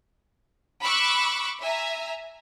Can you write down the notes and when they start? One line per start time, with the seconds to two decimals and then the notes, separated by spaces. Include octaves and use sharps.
0.82 B5 C#6 D6 E6 F#6
1.61 E5 G#5 A#5